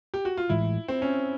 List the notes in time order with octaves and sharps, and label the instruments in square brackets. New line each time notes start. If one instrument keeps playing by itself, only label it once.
[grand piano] G4
F#4
F4
[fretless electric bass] A2 E3 G#3 [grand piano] E4
[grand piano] C4
C#4